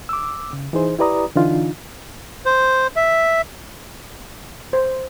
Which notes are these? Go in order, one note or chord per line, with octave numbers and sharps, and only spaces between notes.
D6 E6
C#3
E3 D#4 G#4 C5
E4 G4 B4 D5 A#5 D#6
D3 E3 D4 D#4 F4
C5
E5
C5